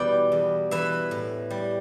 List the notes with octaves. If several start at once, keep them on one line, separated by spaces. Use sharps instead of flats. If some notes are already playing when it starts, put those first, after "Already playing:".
Already playing: E2 B2 G3 B4 D5 G5
E2
E3 B4 E5
A2
G3